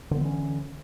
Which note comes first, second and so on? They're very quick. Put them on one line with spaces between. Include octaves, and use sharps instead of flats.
D3 B3 E3 C#4